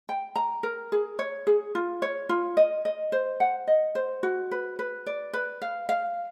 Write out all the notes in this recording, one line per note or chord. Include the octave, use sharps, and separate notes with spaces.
G5
A#5
A#4
G#4
C#5
G#4
F4
C#5
F4
D#5
D#5
C5
F#5
D#5
C5
F#4
B4
B4
D5
B4
F5
F5